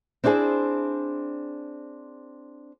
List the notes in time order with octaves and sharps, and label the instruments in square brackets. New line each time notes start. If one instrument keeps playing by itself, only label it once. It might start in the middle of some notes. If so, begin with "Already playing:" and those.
[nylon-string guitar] C4 D4 E4 F#4 G#4 C5